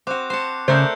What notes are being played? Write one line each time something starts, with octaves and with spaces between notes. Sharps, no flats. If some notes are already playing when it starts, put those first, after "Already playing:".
C4 F#4 D6 F#6
C5 A5 C7 C#7
C#3 A3 A#4 C5 D5 E6 F#6 G6